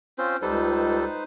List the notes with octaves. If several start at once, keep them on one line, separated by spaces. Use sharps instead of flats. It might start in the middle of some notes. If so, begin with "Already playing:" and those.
C4 C#4 F4 C5
C#2 G3 D#4 A4 B4 C5